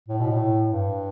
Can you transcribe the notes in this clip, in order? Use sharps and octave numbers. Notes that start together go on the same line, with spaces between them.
A2
B2
A2
G2